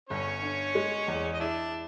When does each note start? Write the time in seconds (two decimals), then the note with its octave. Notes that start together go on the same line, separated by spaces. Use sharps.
0.09 G1 C#4 C#5
0.42 D3
0.75 G#3
1.08 E2
1.34 D#5
1.40 D4 E4 D5